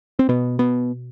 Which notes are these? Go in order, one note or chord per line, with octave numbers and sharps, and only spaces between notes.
C4
B2 B3
B3